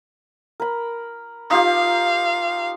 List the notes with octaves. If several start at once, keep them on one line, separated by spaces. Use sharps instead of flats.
A#4 B5
D#4 F4 G4 F5